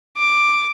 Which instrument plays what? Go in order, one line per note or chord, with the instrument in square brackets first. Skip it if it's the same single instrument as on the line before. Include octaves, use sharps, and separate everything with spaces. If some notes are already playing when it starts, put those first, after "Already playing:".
[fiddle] D6